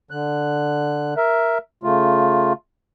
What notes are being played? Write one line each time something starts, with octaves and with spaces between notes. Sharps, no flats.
D3 F#6
A#4 E5
C#3 A3 F4